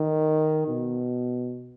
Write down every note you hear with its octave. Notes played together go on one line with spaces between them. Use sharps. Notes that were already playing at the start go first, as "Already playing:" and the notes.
Already playing: D#3
B2